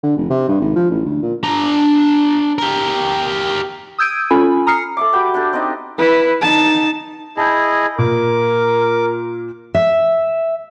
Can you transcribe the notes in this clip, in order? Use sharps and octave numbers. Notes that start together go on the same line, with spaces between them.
D3
F1
C3
G2
G#1
F3
A1
D2
A#2
D4 A#5
G4 A#4
D#6 E6 G6 G#6 D7 D#7
C#4 F4 A4 G#5 B5
A#5 D#6 F6 C7 C#7
A4 E5 D6
F#4 G4 G5 B5
D4 G4 A4
C4 D4 D#4 D#5
E4 B4
D#4 A5
E4 G#4 D#5 A5 G6
A#2 A#4 D6
E5